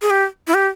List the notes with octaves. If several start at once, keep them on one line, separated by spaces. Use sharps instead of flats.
G#4
G4
E4
G4